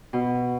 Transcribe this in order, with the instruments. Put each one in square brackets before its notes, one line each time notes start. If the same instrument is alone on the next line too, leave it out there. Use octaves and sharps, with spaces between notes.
[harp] B2